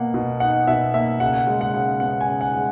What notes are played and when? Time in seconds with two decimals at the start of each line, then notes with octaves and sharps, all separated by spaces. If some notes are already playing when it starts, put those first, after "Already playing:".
Already playing: B2 A#3 F#5
0.14 B2
0.40 D#4 F#5
0.67 B2 E5
0.94 A#3 E5
1.20 C#3 F#5
1.47 G#3
1.61 F#5
1.74 C#3
2.00 B3 F#5
2.21 G#5
2.27 C#3
2.41 F#5
2.55 G#3